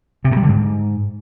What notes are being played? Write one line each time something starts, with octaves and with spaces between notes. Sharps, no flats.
C3
G2
G3
D3
G#2